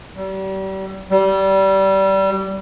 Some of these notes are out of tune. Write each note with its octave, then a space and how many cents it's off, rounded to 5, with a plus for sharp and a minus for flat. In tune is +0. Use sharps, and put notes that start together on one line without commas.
G3 -35
G3 -20